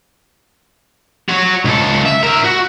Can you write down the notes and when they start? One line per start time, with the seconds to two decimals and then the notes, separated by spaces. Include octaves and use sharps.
1.29 F#4 C#5
1.65 C#2 A4
2.06 E5
2.23 A#4 E5
2.45 F#4